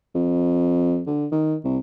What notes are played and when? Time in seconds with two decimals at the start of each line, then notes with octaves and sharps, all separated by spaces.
0.15 F2
1.06 D3
1.32 D#3
1.64 C2